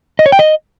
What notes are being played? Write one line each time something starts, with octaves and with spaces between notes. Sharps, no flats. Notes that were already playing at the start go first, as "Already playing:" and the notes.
D#5
C#5
G5
D#5